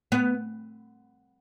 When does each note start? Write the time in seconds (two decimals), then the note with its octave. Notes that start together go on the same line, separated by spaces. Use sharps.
0.12 B3